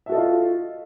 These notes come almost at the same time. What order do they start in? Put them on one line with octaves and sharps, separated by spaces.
E5 F#4 A4 D#5 F4